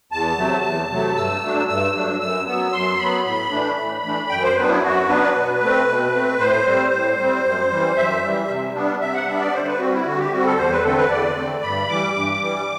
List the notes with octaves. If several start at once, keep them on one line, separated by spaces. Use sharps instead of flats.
E2 A5
C3 F#3 A3
E2
C3 F#3 A3
G2 E6
F#3 A3 D4
G2 E6
F#3 A3 D4
F#2 E6
F#3 B3 E6
F#2 C6
F#3 B3 B5
A2 B5
E3 A3 D4
A2
E3 A3 D4
F#2 G5
C5
F#3 B3 D4 B4
E4
F#2 F#4
F#3 B3 D4 B4
B2
A3 C4
B2
A3 C4
A2 C5
G3 C4
A2
G3 C4
F#2
E3 G3
F#2 E5
E3 G3
C3
G3 B3 D4
C3 E5
F#5
G3 B3 D4 E5
D5
D3 C5
B4
G3 C4 F#4
E4
D3 F#4
G4
G3 C4 F#4
A4
E2 C5
B4
D3 A3 C4 A4
B4
E2 D5
D3 A3 C4
G2 B5
E3 G3 D6
G2
E3 G3